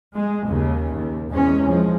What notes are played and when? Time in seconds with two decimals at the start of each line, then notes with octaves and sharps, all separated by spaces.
0.14 G#3
0.48 D#2 C#3
0.95 D#2
1.31 E2 G#3 C#4
1.68 F3 G#3